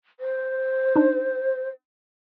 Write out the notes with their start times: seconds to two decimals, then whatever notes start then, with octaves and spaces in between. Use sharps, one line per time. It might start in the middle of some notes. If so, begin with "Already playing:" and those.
0.20 C5
0.96 D4 D#4